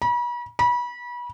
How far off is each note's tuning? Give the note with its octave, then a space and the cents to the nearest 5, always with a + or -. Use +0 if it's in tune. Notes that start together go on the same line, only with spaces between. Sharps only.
B5 -40
B5 -30